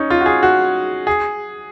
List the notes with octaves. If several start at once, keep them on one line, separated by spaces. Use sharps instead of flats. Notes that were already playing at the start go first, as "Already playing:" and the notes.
Already playing: C#4 D#4
F4
F#4
G#4
F#4
G#4